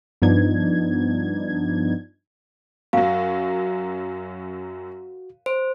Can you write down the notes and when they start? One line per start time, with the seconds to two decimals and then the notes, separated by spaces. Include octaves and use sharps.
0.22 G2 F3 B3 D4 D#4 G#6
2.93 F#2 F#3 F#4 F5
5.46 C5